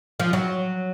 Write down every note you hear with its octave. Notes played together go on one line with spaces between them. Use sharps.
F3
F#3